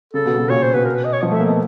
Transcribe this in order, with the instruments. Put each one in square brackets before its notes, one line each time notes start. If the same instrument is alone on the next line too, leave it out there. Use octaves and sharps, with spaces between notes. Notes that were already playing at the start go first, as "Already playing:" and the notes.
[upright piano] C#3 [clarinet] A4
[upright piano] B2
B2
[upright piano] A#2 [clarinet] C#5
[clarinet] C5
[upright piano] B2 [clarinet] B4
[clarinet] A#4
B4
D#5
C#5
[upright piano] F3 [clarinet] D#5
[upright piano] A3
[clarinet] E5
[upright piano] A#3
[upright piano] B3 [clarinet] D#5